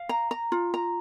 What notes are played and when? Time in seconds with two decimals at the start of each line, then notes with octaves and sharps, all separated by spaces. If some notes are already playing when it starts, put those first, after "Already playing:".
Already playing: F5
0.09 A#5
0.31 A#5
0.52 F4
0.74 A#5